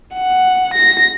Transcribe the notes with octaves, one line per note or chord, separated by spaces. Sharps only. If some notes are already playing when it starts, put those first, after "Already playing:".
F#5
A#6